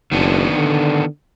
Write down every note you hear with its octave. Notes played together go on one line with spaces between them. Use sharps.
F#1 D#3 B3 D4
D3